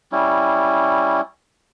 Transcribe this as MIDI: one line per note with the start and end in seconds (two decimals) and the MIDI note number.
0.12 1.21 55
0.12 1.21 61
0.12 1.21 64